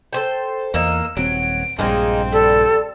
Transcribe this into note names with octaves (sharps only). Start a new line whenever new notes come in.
A4 C5 G5
E2 A#3 D#4 E6
D#1 F#3 C4 D7
A#1 G2 G#3 A#3 C4 D#4
G3 A4